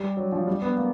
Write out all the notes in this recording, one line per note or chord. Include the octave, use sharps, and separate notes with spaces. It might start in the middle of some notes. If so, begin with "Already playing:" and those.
Already playing: G3
F#3
F3
G3
B3
A#3